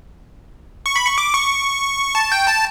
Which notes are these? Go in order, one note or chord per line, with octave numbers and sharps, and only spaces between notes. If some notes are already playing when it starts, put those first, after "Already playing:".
C#6
B5
C#6
D6
C#6
A5
G5
A5